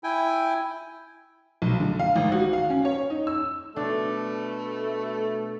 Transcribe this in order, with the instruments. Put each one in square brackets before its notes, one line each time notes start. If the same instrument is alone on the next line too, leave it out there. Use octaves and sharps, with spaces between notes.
[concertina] E4 G5 G#5
[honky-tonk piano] B1
D3
F5
G#1
F#4
F5
C#4
C#5
D#4
E6
[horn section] B2 A3 [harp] D4